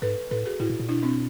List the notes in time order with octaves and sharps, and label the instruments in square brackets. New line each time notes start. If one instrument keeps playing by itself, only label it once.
[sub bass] G#2 [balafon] A4 B4
[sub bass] A2 [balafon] A4 B4
[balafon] F#4 G#4
[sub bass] A2 [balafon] E4 F#4
[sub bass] A#2
A#2
[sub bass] B2 [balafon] D4 E4
[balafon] C4 D4